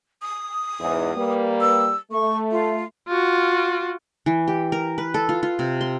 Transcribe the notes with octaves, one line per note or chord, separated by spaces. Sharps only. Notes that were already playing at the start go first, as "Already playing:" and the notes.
D#6
E2 G#2
G3 A#3 B4
E6
A3 C#6
F4
F4 F#4
E3
G4
A#4
B4
A4
F4
F4
C3
C6